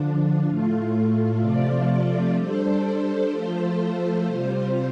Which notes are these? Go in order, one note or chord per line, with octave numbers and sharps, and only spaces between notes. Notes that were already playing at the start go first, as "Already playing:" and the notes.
Already playing: D3 F3 D4
A2 A3 F4
C3 F3 A3 F4 D5
G3 D4 A4 C5
F3 A3 F4 A4 C5
C3 G3 F4 C5